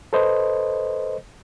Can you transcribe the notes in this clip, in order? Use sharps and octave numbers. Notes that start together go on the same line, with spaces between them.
A4 B4 C5 D#5